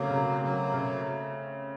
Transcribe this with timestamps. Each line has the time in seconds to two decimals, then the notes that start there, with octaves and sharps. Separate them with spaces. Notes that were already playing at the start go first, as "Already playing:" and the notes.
Already playing: C#3 F#3 A3 A#3 C4
0.10 C#3
0.41 C#3 F#3 A#3
0.74 C#3